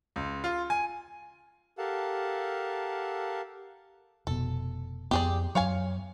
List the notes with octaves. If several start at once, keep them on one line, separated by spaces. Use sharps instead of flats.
C#2
F4
G#5
G4 A4 A#4 F5 F#5 A5
F1 B2 A4
F2 B3 G4 G#4 D5
F#2 F#3 C#5 F5 G#5